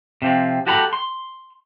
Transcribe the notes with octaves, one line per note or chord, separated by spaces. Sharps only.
C3 F3 C4
F#4 G4 A4 A#5 B5
C6